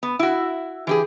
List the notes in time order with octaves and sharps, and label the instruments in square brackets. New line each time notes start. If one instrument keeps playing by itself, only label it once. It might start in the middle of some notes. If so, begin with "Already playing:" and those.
[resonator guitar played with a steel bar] B3
E4 F#4
E3 G4 G#4